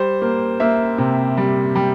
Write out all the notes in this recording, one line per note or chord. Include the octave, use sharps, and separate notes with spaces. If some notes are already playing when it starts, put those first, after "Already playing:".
Already playing: G3 C5
A#3
A#3 E5
C3
G3
G3